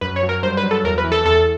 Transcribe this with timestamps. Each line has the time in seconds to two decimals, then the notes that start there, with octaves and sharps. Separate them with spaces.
0.01 F#2 B4
0.16 C#5
0.23 F#3
0.29 A#4
0.43 G2 C5
0.57 B4
0.63 F#3
0.71 A4
0.84 E2 A#4
0.98 B4
1.04 E3
1.12 A4
1.25 E2 A4